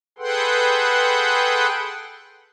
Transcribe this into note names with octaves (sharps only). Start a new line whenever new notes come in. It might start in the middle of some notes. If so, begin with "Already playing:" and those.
G#4 A4 B4 F#5 G5 C6